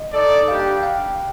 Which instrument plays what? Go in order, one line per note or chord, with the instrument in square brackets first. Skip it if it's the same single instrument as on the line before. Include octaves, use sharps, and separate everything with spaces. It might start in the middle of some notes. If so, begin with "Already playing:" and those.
Already playing: [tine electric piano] D#5
[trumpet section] D#4 A4 D5
[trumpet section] G3 A#3 D4 G4 [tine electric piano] F5
[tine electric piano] G5
F5
F5